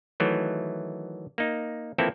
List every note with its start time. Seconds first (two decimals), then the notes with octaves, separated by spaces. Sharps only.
0.20 D#3 E3 F#3 A3
1.38 A#3 D#4
1.98 E3 F3 A#3 C4 E4 A4